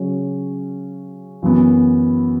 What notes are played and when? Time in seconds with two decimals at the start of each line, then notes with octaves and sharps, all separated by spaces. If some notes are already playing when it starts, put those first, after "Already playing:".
Already playing: C#3 F#3 C#4
1.42 F#2 E3 B3